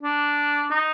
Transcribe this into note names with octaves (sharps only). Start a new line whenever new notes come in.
D4
D#4